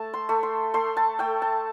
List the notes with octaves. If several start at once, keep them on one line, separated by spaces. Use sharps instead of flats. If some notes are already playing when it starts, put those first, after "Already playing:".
Already playing: A3 A5
C6
A3
C6
A3 C6
A5
A3 G5
A5